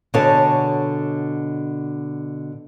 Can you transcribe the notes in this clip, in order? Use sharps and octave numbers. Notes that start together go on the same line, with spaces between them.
B2 D3 F#4 G#4 C#5 A5